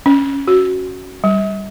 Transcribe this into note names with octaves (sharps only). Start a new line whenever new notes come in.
C#4
F#4
G3